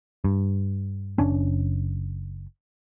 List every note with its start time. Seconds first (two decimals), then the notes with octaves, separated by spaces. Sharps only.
0.24 G2
1.18 F#1 C#4 D4